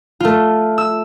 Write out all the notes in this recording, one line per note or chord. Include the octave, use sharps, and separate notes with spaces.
A3 F4
E6